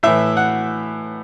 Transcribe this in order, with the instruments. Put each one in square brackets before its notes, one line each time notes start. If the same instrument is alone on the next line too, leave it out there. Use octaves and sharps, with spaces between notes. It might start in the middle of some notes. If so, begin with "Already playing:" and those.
[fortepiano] A2 E3 E5
F#5